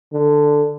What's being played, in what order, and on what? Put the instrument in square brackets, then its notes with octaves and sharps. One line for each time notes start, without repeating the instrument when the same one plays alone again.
[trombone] D3